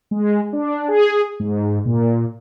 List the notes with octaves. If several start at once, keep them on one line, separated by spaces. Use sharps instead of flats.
G#3
D4
G#4
G#2
A#2